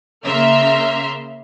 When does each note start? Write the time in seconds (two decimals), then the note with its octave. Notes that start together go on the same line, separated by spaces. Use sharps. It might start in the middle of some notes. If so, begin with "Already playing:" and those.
0.25 C#3 A#3 E5 A#5 C6 F6